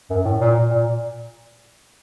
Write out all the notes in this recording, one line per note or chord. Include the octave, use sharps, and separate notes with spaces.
F#2
A2
A#2
A#2